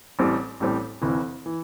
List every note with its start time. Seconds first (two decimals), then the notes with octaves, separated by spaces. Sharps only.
0.19 A1 A2 G3 C4
0.60 A1 A2 G3 C4
1.01 F1 F2 E3
1.46 E3